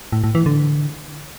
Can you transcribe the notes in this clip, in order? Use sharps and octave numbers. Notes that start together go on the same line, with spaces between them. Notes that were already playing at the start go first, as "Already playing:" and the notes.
A2
A2
E3
D3